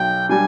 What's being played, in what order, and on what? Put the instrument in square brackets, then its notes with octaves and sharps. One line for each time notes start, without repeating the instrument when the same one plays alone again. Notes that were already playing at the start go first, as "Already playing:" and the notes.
Already playing: [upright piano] B1 [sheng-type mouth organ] G5
[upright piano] G3 D4 [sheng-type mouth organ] G#5